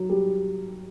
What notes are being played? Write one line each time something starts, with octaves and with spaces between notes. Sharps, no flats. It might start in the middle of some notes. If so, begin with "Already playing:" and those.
Already playing: F#3
G3